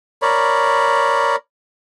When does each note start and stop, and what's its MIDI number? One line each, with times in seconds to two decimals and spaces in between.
0.22 1.36 70
0.22 1.36 73
0.22 1.36 74
0.22 1.36 83